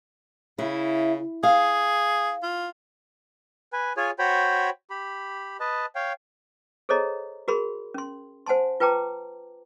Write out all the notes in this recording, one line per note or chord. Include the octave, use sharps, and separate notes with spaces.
C#3 E4
G#4 F5
F4
B4 G#5
F4 G#4 C#5 G#5
F#4 C5 C#5 G5 B5
G4 B5
B4 D#5 A5
C#5 F5 G5
G#4 A4 C5 C#5 D#5 A#5
F#4 G#4 A#4 B5 C6
C#4 C6
C5 F#5 G#5 A5 C6
F4 B4 G5 A5 A#5 D6